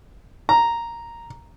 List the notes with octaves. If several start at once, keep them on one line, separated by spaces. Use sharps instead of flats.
A#5